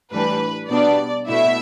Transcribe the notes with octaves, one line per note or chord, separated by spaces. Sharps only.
A2 E3 G3 D4 B4
B2 G3 B3 D4 D5
B2 A3 E4 E5